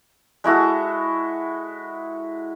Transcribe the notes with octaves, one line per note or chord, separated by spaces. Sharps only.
G#3 E4 F#4 A4